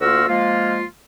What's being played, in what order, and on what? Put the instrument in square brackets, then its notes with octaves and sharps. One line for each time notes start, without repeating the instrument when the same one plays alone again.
[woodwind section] D2 A#3 F4 F#4 E6 F6
F3 G#3 A#3 F4